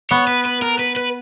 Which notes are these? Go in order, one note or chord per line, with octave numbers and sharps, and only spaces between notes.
B3 C#5
B4
B4
A#4
B4
B4